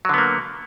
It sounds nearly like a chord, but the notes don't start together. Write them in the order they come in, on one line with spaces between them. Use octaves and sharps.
F#3 D3 B3 A#3